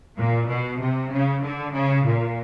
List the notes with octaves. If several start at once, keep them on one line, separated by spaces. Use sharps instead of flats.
A#2
B2
C3
C#3
D3
C#3
A#2